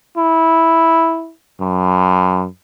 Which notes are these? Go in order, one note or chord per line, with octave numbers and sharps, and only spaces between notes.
E4
F#2